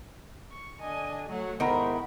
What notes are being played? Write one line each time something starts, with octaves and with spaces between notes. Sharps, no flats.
C#6
D3 D4 D#5 G#5
F#3 A3 F#5
G#2 D#3 B3 E4 A#4 C5 B5